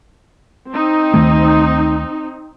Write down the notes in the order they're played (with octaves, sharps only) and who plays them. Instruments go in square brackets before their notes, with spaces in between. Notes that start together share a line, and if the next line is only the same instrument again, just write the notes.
[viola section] C4 D#4
[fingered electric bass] D2 D#3 A3